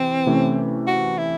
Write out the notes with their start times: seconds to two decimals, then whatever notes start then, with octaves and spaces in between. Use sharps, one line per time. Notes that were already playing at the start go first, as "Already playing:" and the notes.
Already playing: C3 E3 C4
0.26 C3 E3 A3 C#4
0.87 F#4
1.18 E4